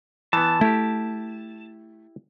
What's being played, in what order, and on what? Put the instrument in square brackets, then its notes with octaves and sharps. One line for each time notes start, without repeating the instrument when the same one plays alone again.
[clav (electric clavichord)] E3 B3 [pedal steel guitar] A5
[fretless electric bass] A3 [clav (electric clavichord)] E4 G4